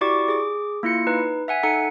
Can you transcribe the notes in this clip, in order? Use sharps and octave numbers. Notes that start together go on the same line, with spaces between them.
E4 F#4 G4 D5 C#6 D6
G#4 D6
A#3 E4 F4 C#7
D#4 B4
E5 F#5 G#5
D#4 A4 F#5 C#7